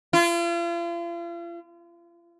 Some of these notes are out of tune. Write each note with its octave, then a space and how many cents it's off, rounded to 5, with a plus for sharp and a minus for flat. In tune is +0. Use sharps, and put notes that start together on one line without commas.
F4 -40